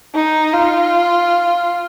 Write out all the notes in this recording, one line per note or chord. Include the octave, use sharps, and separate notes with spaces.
D#4
F4